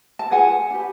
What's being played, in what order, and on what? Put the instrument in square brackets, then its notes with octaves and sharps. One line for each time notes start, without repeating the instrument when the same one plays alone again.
[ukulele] A5
F4 G#4 B4 F#5 G#5
D4 G4 B4